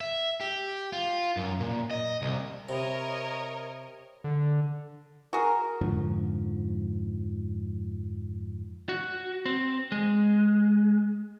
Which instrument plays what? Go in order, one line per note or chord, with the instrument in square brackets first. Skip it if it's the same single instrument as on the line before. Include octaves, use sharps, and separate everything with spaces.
[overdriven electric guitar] E5
G4
F4
F#2
A#2
D#5
C2
[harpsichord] C3 [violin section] A#4 C#5 D#5 [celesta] C5 E5 B5
[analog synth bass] D3
[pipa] F#4 G#4 [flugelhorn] A#4
[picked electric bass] F2 G#2 D3 F3
[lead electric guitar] F#4
C4
G#3